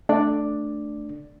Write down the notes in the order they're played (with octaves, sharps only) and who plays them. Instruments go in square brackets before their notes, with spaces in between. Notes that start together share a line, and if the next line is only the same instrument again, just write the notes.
[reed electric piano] A3 D4 D5